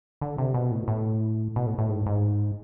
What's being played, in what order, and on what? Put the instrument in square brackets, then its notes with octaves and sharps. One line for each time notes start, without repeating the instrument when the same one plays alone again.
[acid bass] D3
C3
B2
A2
A2
B2
A2
A2
G#2
G#2